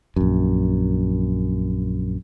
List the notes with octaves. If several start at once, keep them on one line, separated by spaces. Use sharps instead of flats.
A#1 F#2